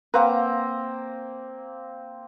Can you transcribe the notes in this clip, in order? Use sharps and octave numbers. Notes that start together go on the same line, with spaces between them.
A#3 C4 B4 F5 F#5 A#5